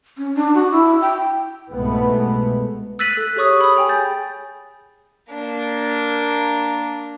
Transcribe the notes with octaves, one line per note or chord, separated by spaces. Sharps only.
C#4
D4
F#4
E4
G5
C2 G#2 B2 G#3 A3 B3
E6 F#6 A6 B6 D#7 F#7
A4 F#6
G4 G#4 C#5 C#6 D#6 E6
B5 D#6
G#4 G5 G#5
G6 A6
A#3 D4